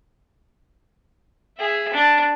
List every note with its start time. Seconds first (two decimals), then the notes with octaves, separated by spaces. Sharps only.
1.58 G#4 E5
1.94 D4